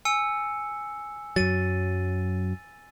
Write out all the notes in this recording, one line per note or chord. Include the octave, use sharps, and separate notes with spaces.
G#5 E6 C#7
F#2 F#3 A6 D#7